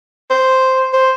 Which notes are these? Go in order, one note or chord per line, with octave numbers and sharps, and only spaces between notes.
C5
C5